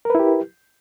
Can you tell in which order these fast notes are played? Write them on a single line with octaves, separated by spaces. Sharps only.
A#4 B4 E4 G4